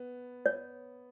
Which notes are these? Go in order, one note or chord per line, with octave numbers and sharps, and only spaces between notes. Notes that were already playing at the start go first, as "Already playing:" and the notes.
Already playing: B3
C#5